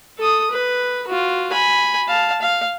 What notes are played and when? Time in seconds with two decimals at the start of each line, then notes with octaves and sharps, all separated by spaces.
0.19 A4 D#6
0.51 B4
1.07 F4 F#4
1.52 G#5 B5
2.09 F5 A5
2.42 F5